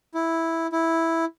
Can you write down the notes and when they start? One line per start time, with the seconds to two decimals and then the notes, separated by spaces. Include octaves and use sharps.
0.14 E4
0.72 E4